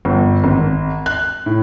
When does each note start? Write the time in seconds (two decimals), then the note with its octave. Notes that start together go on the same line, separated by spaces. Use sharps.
0.05 G1
0.44 G#1
1.06 F#6
1.46 A2